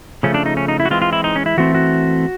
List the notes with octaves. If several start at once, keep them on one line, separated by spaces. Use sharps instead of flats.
C#3 F3 A3 C#4
D4
D#4
C#4
D#4
E4
F#4
E3 G#3 C4 F4
F4
E4
D#4
C#4
E4
E3 A3 C4 F#4
F#4